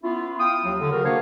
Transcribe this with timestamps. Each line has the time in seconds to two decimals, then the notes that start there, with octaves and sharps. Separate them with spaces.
0.04 B3 C#4 E4 F4
0.40 F5 G5 D#6
0.65 D#2 F#3
0.79 D3
0.91 C#3 F#4 A#4
1.04 A#3 D4 F#4 C5 C#5 F5